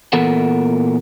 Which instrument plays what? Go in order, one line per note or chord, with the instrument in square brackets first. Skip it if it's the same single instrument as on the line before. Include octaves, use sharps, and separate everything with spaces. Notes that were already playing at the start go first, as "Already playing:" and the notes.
[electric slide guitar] A#2 E3 B3 A4 A#4 F#5